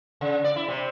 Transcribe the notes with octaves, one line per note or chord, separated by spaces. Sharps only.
C#3
D5
E4
C3